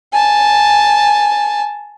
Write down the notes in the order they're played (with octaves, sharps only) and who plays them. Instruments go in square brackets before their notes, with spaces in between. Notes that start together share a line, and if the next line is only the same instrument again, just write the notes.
[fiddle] G#5 A5